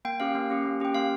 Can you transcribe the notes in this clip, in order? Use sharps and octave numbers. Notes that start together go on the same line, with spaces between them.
A#3 G5
C#4 G4 F5
A#3
C#4 G4
A#3
C#4 G4 G5
A#3 F5